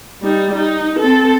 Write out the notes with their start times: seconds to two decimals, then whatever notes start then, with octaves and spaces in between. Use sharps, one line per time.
0.22 G3 D#4
0.54 D#4
0.99 C4 A4